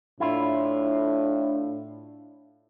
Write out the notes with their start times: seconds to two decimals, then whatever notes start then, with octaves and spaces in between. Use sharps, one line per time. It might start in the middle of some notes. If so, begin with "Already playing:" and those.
0.20 A2 D4 E4 F4